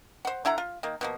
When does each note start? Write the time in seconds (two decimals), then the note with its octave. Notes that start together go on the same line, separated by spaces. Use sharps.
0.25 C5 F#5
0.45 D3 E4 F#5 A#5
0.58 F4
0.83 D#3 A#3
1.01 B2 F3 A#3